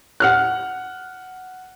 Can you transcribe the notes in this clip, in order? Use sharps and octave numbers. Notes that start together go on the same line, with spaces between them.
F#5 F6 F#6